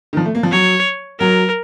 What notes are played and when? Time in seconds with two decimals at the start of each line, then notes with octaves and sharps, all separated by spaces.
0.13 D#3
0.17 F3
0.25 A3
0.35 A#3
0.43 F3
0.52 F#3 C#5
1.20 F#3 A#4